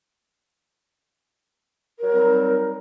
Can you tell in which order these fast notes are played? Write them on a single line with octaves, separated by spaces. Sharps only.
A#4 F#3 G3 C4 D#4